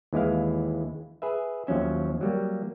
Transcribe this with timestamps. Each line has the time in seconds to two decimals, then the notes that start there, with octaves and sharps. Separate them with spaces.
0.13 D#2 E3 G#3 E4 F5
1.22 G#4 B4 E5
1.67 D#2 F3 F#3 C#4 E5
2.21 F#3 G3 A#3